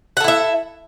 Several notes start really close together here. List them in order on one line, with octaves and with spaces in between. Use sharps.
F#5 A4 E4 E5